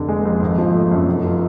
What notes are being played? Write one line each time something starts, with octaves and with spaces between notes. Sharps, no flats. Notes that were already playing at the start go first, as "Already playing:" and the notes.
Already playing: F1 D3
G#3
F2
G#1
F3
A3
F#2
F1
F3